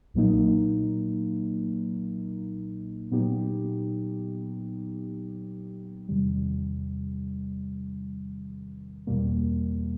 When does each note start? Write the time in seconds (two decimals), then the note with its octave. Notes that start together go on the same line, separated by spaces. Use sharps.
0.14 B1 A#2 F#3 A#3 D#4
3.11 A#2 F#3 B3 D#4 G4
6.09 E2 C3 D#3 G3
9.07 E2 B2 G3 A#3